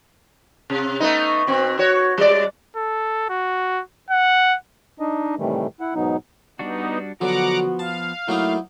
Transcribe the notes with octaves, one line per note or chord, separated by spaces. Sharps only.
C3
A3 B3 D#4
B2 C4
F#4 C#5
G3 D5
A4
F#4
F#5
D4 D#4 D#5
A2 C3 D#3 E3 G3 A3
E4 F#5
G#2 B2 F#3 B3 D#4
G3 B3 D4 D#4 F#4
D3 F3 F#3 B3 F#4 F#5 A#5 D6
F5 A5
F#3 A3 A#3 D#4 E4